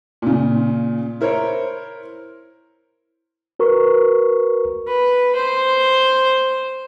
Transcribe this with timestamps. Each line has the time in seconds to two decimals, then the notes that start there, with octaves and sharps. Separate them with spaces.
0.22 A#2 C#3
1.21 E4 A#4 C5 C#5
3.59 F#4 A#4 B4 C#6
4.88 B4
5.35 C5